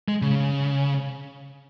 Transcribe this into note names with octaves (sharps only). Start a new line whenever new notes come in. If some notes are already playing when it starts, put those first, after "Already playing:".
G#3
C#3